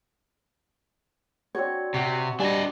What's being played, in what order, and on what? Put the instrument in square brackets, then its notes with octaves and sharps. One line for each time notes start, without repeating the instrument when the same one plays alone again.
[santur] C4 D4 F#4 [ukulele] C#5
[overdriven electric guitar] C3 [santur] F#4
[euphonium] G3 [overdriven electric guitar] D4 D#5 [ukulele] G#5